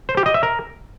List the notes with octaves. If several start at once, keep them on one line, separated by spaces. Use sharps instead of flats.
C5
G4
D#5
E5
A#4